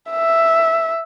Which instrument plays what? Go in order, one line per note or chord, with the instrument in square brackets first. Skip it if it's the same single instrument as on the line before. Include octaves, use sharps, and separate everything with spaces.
[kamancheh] E5